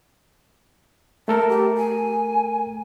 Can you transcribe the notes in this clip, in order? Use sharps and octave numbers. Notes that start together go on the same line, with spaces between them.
A3 A4 A#4 A5
G4
G#5